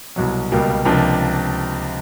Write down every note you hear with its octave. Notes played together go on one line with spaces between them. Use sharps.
C2 B2 F#3
C#2 B2 G3 A#3
C#2 C3 F3 A#3 D4